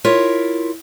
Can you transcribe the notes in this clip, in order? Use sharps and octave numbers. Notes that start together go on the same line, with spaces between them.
E4 F4 A#4 C#5 E5